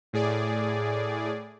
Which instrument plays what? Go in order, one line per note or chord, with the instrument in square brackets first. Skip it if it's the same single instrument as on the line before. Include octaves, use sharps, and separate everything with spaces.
[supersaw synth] A2 G#4 D5